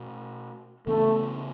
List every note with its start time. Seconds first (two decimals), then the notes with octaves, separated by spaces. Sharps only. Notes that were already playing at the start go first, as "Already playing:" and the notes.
Already playing: B2 A3 D4
0.87 C#3 E3 A3 B3 D4